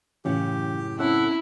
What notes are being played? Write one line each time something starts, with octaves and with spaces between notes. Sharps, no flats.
F#2 A2 C#3 E3 C#4 F4 G4
C4 C#4 E4 A4 F#5